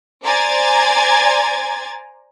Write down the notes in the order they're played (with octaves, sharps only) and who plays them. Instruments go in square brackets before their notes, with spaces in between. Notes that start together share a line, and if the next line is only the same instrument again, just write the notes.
[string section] C5 D5 G#5 A#5 G#6 A6